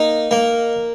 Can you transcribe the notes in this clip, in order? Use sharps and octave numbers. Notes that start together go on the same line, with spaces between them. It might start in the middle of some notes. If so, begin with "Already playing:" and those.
Already playing: A#3 D#4
A#3